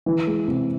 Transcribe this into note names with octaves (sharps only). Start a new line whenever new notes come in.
E3
G#3
C3